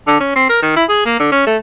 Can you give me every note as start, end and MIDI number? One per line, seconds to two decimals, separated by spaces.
0.07 0.19 50
0.20 0.34 61
0.36 0.46 60
0.49 0.60 70
0.62 0.74 51
0.76 0.84 64
0.89 1.04 68
1.05 1.15 58
1.19 1.27 50
1.32 1.44 61
1.46 1.57 57